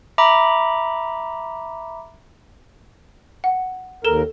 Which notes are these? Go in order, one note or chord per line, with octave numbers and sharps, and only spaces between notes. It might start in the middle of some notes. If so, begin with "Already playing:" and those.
E5 A#5 B5 D6
F#5
D#2 A4 A#4 E7 G7